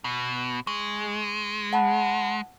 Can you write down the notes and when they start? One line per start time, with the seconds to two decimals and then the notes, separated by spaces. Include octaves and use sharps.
0.04 B2
0.67 G#3 C#6
1.73 F#5 A5 B5